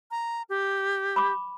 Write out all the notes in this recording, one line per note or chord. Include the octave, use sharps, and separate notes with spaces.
A#5
G4
B5 C#6 D6